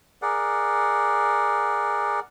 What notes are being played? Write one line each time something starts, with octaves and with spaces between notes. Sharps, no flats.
G#4 A#4 D5 F#5